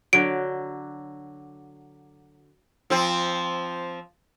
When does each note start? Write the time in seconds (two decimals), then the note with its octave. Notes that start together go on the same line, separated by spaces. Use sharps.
0.13 D3 F#3 D7
2.90 F3 C4